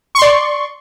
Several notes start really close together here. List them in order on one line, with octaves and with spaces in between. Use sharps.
C#6 C6 D5